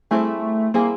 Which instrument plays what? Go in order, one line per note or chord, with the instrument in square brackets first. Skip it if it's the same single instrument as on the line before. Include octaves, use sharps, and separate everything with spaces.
[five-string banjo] G3 C4 E4 G#4 [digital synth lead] A3
[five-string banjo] G3 C4 E4 G#4 [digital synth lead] A#3